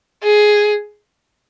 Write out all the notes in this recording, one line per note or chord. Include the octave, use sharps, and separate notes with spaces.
G#4